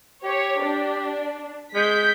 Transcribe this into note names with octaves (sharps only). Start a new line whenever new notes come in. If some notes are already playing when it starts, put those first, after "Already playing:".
G4 C#5
D4
G#3 G6 B6